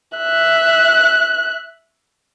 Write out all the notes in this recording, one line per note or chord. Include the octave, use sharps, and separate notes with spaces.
E5 F#6